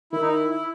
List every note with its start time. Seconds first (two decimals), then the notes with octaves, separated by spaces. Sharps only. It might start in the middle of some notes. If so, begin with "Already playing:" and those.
0.12 D#3 E4
0.22 D#4
0.30 E4
0.50 E4